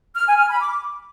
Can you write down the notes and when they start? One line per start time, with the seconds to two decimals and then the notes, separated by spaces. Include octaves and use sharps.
0.15 F6
0.26 G#5
0.38 F6
0.49 B5
0.60 D6